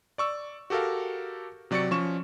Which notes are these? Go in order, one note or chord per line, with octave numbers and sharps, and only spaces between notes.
D5 C#6 E6
F#4 G4 A4 A#4 F5
C3 F#3 D5 C#6 A6 C#7
F3 C#4 C#6 E7